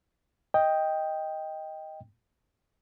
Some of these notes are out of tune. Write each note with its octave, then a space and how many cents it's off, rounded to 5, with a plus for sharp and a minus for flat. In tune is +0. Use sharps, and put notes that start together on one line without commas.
D#5 +10 G5 +5